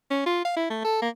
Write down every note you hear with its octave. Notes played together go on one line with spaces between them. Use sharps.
C#4
F4
F5
E4
A3
A4
A#3